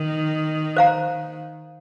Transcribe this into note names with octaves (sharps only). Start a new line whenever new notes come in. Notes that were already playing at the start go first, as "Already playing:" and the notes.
Already playing: D#3
C5 F5 A#5